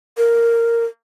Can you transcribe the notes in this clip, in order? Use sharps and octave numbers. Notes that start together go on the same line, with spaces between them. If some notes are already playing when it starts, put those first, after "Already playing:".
A#4